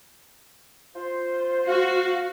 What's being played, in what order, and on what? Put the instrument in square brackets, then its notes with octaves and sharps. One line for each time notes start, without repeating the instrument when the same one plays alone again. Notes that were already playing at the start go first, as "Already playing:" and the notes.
[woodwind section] F4 C5
[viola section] F#4 [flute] F5